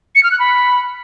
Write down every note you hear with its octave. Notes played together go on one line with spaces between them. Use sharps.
C#7
F6
F#6
B5